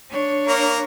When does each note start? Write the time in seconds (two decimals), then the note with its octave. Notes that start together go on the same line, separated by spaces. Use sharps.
0.10 D4 C#5
0.48 A#3 A#5